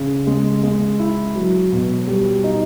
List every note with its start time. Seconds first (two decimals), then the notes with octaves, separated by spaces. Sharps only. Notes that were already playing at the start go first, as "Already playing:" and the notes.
Already playing: C#3
0.27 G#3
0.63 G#3
0.99 E4
1.35 F#3
1.72 B2
2.07 G3
2.44 D#4